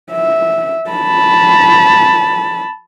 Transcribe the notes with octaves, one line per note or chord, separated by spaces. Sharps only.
E5
A5 B5